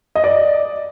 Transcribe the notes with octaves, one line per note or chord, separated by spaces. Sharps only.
D#5
D5